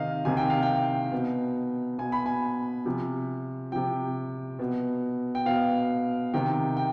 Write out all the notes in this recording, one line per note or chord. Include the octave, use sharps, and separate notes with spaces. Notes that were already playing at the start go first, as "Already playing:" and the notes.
Already playing: C3 D#3 D#5 F5
C3 D#3 G#5
G5
F5
G5
B2
B2 G#5
B5
G#5
C3 F3
C3 F3 G5
B2
G5
B2 F5
C3 D#3 G5
G5